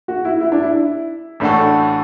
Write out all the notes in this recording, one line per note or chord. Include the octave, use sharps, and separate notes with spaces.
F#4
E4
E4
D4
E4
A1 A2 A3 D4 F#4 A4